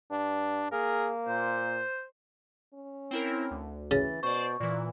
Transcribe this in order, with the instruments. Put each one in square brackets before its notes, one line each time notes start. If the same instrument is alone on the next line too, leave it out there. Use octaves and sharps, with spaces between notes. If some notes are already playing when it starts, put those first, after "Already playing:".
[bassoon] G2 [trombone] D4
[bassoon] A#3 [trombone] G#4 [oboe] A#4
[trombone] A#2 [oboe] C5
[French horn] C#4
[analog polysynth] C4 E4 A#4
D2
[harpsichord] C#3 [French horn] E3 [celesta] A6
[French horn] B2 [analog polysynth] C5 D5 [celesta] C#6
[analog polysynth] A#2 E3 [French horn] D5